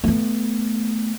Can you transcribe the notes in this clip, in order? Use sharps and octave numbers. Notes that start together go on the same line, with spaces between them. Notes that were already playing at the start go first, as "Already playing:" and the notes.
A3 B3